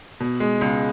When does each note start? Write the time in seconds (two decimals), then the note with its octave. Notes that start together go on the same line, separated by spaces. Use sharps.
0.20 B2
0.40 G#3
0.61 C#2